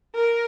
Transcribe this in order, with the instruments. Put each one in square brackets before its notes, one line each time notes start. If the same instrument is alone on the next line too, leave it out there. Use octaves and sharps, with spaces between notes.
[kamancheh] A#4